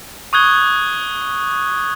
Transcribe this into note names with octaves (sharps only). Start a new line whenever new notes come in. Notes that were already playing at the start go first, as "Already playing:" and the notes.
C#6 D#6 F#6 G#6 G7